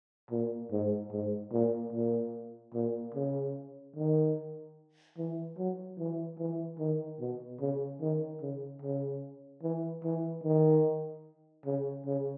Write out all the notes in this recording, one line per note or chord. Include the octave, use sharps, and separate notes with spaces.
A#2
G#2
G#2
A#2
A#2
A#2
C#3
D#3
E3
F#3
E3
E3
D#3
B2
C#3
D#3
C#3
C#3
E3
E3
D#3
C#3
C#3